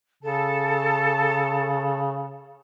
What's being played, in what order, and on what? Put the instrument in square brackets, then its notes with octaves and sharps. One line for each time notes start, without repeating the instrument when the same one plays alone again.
[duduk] C#3 [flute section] A4 A5